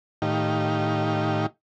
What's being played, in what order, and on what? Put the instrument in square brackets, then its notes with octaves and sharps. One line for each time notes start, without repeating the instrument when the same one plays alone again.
[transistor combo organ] A2 D#3 D#4 G4 F5